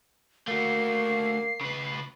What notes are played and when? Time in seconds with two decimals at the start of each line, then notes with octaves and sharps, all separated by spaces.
0.48 A3 A#3 F#4 C7
1.61 C#3 B4